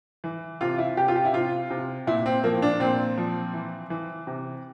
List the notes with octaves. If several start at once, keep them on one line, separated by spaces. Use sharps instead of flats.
E3
C3 F4
E4
C3 G4
F4
G4
E4
C3 F4
C3
A#2 E4
C4
F3 A#3
D4
A#2 C4
F3
E3
E3
C3